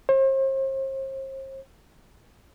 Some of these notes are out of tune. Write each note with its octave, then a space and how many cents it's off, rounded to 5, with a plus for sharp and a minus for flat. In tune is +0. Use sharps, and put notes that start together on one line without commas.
C5 +40